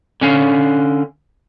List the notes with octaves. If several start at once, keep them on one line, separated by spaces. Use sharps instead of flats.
D3 C#4 F5